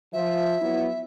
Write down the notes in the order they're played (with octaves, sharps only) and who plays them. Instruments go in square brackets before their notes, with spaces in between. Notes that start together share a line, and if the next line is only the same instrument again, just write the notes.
[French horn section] F3 [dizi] E5
[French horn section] F#3 B3 E4